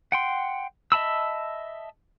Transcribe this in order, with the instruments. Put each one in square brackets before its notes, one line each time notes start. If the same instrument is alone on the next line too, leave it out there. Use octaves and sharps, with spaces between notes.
[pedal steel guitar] F#5 G5 C6
D#5 E5 A5 B5 E6